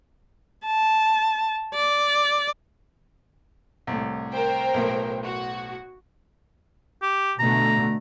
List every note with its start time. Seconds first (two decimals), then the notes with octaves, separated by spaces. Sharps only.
0.66 A5
1.74 D5
3.87 C2 A2
4.32 A#4 C5 G5
4.74 B1 A2
5.24 F#4
7.02 G4
7.39 B2 D3 A3 A#5